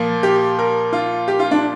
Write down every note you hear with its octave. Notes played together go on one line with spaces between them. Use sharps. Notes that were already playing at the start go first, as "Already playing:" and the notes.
Already playing: A#2 F3 A#3
G4
A#4
F4
G4
F4
D4